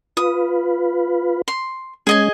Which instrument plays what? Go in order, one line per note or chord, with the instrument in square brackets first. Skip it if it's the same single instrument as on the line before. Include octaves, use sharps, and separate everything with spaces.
[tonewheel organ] F4 B4 [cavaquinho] D#6
[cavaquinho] C6
[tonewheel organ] G#3 C#4 [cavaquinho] G#4 D#5 G#5